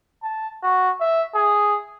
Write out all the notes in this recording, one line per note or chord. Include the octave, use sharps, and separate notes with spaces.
A5
F#4
E5
G#4